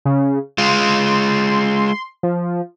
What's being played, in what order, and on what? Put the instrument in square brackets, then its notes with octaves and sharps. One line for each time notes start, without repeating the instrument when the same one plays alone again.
[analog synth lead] C#3
[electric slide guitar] G#3 F4 [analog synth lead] C6
[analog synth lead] F3